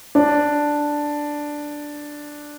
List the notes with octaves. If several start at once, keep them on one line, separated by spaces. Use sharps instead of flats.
D4